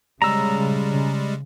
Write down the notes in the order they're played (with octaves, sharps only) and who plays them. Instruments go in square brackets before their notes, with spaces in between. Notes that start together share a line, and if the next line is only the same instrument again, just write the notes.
[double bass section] C#3 [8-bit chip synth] G3 G#3 [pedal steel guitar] A#5 E6